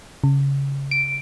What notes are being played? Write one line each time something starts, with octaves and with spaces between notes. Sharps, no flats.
C#3
D7